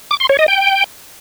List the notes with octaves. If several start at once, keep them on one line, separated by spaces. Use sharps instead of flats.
D6
C6
C#5
D#5
G5